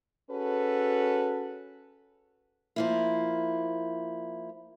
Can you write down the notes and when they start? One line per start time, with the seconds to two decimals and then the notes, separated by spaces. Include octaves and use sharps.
0.30 C#4 F#4 G#4 A4 B4
2.76 F3 A#3 E4